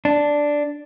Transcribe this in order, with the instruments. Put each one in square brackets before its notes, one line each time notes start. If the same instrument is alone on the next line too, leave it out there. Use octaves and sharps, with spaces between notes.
[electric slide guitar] D4